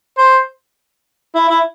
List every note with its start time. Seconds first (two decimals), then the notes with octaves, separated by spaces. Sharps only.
0.18 C5
1.35 E4
1.49 E4